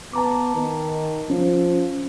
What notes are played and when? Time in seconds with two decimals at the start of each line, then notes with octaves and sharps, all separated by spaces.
0.13 B3 A5 A#5 D6
0.55 D#3
1.30 F3 C#4